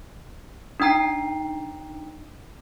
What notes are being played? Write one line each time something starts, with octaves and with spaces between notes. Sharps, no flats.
D4 D#4 G5 A#5 C7